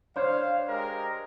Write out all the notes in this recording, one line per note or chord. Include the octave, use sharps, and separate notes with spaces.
D4 C5 C#5 F5
G#3 G4 A#4